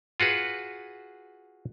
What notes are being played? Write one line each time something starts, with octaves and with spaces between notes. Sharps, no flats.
F4 F#4 G#4 B4